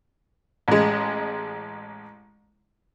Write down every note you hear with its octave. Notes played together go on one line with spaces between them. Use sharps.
A1 G#3